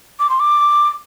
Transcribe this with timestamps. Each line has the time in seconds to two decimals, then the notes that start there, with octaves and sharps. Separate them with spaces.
0.20 D6
0.30 C6
0.40 D6